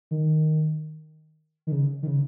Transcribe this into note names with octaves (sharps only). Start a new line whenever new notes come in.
D#3
D#3
C#3
D#3
C#3